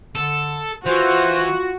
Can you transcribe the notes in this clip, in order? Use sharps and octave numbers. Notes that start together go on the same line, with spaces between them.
D3 A4
E3 F4 F#4 C5